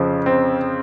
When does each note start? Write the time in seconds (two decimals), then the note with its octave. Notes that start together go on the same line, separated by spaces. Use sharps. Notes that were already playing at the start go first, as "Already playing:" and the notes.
Already playing: F2 C#3 F3
0.26 C4